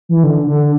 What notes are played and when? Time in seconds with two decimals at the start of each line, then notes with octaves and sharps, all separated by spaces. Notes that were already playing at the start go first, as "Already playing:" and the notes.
0.09 E3
0.23 D3
0.47 D3